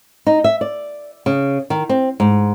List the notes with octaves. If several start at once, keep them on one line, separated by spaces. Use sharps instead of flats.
D#4
E5
D5
C#3
D#3
C4
G#2